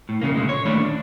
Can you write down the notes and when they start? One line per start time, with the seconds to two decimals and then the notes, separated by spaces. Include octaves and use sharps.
0.09 A2
0.22 F2 C#3 A#3
0.35 A#2 D3 G#3
0.49 C#5
0.66 D#2 G3 A3 D4 B5
0.80 D4